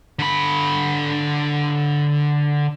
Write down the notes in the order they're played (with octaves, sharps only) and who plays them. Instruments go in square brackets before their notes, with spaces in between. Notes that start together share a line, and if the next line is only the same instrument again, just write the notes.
[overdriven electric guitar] D3 B5